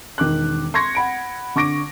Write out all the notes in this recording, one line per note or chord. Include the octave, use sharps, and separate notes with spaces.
E1 D#3 D6 F#6
C6 C#6 G#6 A#6 C#7
F#5 B5 D7
D3 C#6 D6 A#6 D7